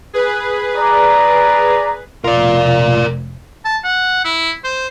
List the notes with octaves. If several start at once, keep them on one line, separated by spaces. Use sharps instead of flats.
G#4 B4
D5 A#5
F1 F4 A#4 D5
A5
F#5
E4
C5